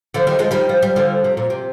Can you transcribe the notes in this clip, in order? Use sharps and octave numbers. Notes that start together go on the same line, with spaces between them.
D3 F3
D#3 G3
F3 G#3
D#3 G3
F3
G3
D3 F3
C3
A#2
C3